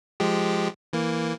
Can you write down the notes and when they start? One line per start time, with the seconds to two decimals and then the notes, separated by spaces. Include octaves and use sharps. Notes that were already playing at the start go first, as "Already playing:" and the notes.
0.20 F3 G#3 G4
0.93 E3 A#3